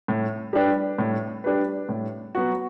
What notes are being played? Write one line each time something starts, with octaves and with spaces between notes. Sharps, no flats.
A2
G3 D4 G4 B4
A2
G3 D4 G4 B4
A2
F#3 B3 F#4